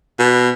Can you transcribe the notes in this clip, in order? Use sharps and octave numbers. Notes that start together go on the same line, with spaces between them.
B2